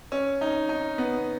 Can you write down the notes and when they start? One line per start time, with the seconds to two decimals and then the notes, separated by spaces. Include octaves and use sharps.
0.12 C#4
0.41 D#4
0.69 D#4
0.98 B3